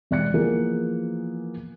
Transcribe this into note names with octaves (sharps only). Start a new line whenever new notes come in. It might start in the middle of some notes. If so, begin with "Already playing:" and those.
E1 D5 F#6 C#7
E3 F3 A#3 B3 G#4 A#4